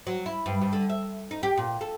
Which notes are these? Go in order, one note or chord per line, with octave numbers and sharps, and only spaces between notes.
F#3
E4
G2
G2
D3
E5
D#4
G4
A#2
A4